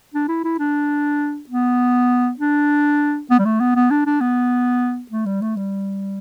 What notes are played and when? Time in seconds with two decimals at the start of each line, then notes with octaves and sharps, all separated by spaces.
0.14 D4
0.28 E4
0.44 E4
0.59 D4
1.49 B3
2.39 D4
3.30 B3
3.39 G3
3.45 A3
3.60 B3
3.76 B3
3.91 D4
4.06 D4
4.21 B3
5.11 A3
5.26 G3
5.42 A3
5.56 G3